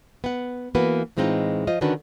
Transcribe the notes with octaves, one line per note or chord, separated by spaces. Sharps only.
B3 F#5
E3 A#3 B3 F#4 B4
A2 E3 G#3 C4 D#4 F4
F3 F4 C5 D#5
D3 D#3 C#4 D4 F#4 B4